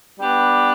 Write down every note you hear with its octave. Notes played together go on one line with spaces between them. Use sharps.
G3 B3 D4 G4 B4